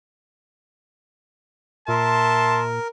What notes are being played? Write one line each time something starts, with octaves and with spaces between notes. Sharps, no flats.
A#2 A#4 E5 A5 C6